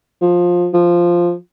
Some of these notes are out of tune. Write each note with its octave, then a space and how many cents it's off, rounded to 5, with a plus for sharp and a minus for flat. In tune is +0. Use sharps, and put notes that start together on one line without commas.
F3 +15
F3 -5